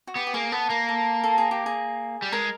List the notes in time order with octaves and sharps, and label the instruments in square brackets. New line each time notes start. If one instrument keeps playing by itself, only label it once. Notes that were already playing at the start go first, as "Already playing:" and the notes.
[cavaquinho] F#4
[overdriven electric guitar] B3 [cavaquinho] G4
[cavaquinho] G4
[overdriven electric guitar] A#3 [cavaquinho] G#4
[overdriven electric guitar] B3 [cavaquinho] A4
[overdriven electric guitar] A#3 [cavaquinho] A#4
[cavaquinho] A4
A4
G#4
G4
G#4
[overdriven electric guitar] G3
[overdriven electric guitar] G#3 [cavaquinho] A#4